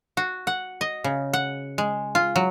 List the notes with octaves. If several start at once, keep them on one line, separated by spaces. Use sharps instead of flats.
F#4
F#5
D#5
C#3
F#5
G#3
F4
F#3